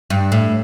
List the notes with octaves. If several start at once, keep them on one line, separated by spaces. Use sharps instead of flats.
G2
A2